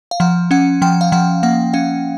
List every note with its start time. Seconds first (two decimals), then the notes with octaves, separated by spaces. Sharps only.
0.11 F5
0.20 F3 F#5
0.51 C#4 F#5
0.82 F3 G5
1.01 F5
1.12 F3 F#5
1.43 A#3 F#5
1.73 C#4 F5